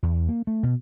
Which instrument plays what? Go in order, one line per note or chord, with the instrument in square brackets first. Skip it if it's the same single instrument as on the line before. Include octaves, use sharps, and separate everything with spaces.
[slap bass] E2
A#3
A3
B2